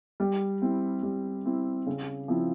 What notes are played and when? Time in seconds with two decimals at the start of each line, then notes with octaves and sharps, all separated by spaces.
0.20 G3
0.62 C4 E4
1.03 G3
1.46 C4 E4
1.86 C#3
2.28 F3 C4 E4